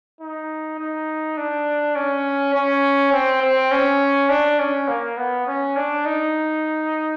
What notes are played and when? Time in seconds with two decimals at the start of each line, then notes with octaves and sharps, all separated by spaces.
0.21 D#4
0.79 D#4
1.37 D4
1.96 C#4
2.54 C#4
3.12 C4
3.42 C4
3.71 C#4
4.30 D4
4.59 C#4
4.88 A#3
5.17 B3
5.47 C#4
5.76 D4
6.06 D#4